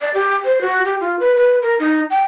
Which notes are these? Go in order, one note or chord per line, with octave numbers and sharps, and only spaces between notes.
D5
G4
C5
F#4
G4
F4
B4
B4
A#4
D#4
G5